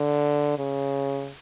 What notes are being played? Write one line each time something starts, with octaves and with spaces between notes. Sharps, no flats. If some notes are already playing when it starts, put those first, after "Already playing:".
Already playing: D3
C#3